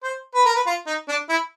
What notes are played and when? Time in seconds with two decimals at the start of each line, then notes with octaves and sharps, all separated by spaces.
0.03 C5
0.35 B4
0.46 A#4
0.55 B4
0.66 F4
0.86 D#4
1.08 D4
1.29 E4